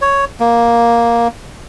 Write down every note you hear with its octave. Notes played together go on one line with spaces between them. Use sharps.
C#5
A#3